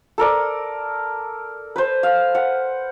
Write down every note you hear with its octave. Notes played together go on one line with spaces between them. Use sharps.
A4 A#4 D5
B4 C5
F5
F#5